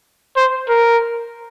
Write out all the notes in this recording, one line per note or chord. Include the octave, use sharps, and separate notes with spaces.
C5
A#4